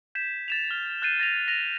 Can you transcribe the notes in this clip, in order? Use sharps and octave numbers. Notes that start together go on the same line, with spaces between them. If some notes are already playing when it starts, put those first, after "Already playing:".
G6 G#6 B6 E7
A6 E7 F7
F6 G7
F#6 G6 A6 C7 D#7
A6 A#6 C7 F7
A#6 D#7 F7